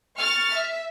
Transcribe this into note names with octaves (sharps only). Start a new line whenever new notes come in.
C#6 F6 A6
E5